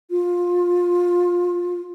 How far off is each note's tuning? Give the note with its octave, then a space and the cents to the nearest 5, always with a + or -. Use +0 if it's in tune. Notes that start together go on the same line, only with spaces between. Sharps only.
F4 +20